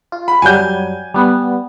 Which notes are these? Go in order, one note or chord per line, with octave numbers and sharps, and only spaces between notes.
F4
B5
F#2 F#3 G3 G#5 G6
G3 B3